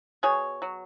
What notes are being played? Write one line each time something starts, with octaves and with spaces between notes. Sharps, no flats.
B2 G#4 C#5
F#3